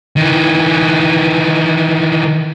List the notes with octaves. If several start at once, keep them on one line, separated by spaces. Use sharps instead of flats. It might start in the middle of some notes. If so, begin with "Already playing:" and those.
D#3 E3